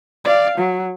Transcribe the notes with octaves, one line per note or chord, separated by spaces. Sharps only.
D5 F5
F#3